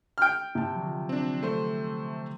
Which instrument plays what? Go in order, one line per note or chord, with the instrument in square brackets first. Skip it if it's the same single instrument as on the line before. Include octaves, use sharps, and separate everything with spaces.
[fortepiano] G5 F6
[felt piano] C3 A5
[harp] D3 F3 F#3
[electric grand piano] C4 D4
A3 C5